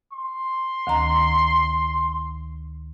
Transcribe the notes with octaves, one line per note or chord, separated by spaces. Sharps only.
C6
D2 D#3 A#5